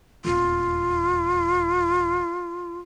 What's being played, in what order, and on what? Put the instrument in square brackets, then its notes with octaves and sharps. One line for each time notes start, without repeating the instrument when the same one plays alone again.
[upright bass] D#1 E2 [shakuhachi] F4